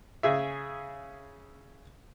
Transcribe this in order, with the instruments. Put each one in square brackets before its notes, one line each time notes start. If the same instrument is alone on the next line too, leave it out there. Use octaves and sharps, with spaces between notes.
[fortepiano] C#3 G#4 E5